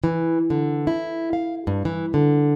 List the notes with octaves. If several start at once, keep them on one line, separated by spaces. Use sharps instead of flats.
E3
D3
E4
F5
G2
E3
D3